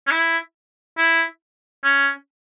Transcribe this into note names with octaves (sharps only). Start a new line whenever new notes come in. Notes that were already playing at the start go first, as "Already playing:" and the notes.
C#4
E4
E4
C#4